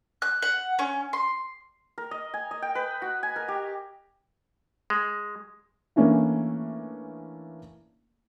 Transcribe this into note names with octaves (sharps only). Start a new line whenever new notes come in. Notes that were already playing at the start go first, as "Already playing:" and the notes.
F#6
F#5
C#4
C6
A#4
D#5
G#5
D#5
G5
B4
F#4
G#5
A#4
G4
G#3
E3 A3 A#3 C#4 D4 E4